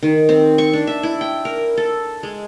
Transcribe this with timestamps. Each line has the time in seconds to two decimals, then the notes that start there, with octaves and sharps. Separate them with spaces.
0.03 D#3
0.29 C4
0.58 C#6
0.73 D4
0.87 E5
1.03 E4
1.21 G5
1.45 A#4
1.77 A4
2.23 G#3